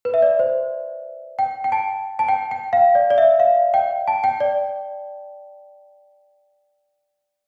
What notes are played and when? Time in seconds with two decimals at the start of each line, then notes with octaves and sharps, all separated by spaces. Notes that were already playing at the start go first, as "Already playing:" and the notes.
0.05 B4
0.14 E5
0.22 D5
0.39 C5
1.39 G5
1.64 G5
1.72 A5
2.19 A5
2.28 G5
2.51 G5
2.73 F5
2.95 D5
3.11 D5
3.18 E5
3.40 F5
3.74 G5
4.08 A5
4.24 G5
4.40 D5